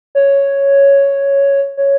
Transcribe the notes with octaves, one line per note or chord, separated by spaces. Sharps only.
C#5
C#5